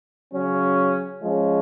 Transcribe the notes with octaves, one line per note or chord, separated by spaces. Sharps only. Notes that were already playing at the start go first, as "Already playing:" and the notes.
C#3 F#3 C#4
F3 G#3 C#4